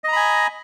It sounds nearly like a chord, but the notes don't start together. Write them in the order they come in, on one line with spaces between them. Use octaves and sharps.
D#5 A#5 B5 G#5